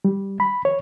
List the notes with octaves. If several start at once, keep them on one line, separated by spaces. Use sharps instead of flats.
G3
B5
C#5